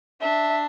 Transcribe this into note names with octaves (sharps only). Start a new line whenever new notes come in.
D4 E5